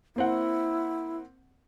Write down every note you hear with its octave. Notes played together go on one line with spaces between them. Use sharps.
A#3 C4 E4 F#5